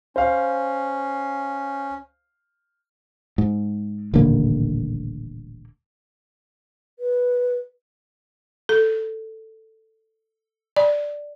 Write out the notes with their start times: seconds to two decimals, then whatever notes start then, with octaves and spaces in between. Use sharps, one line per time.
0.16 C#4 C5 F5
3.38 G#2
4.14 D#1 A1 D3 A#3
6.99 B4
8.69 A4
10.76 D5